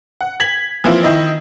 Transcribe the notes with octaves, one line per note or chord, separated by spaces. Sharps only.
F#5
G#6 B6 F#7
E3 F3 A#3 C4 E4 F4
D#3 E4 D#5